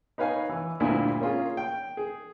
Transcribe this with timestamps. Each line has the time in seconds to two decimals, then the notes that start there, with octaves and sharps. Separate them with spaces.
0.18 D#4 B4 C#5 F5 G#5
0.49 E3
0.80 D2 G2 A#2 E4 F4 G#5
1.20 A#3 C#4 F4 G#4
1.57 G5
1.97 G#4